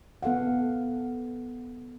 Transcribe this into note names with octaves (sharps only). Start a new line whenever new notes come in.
B3 A4 F5 F#5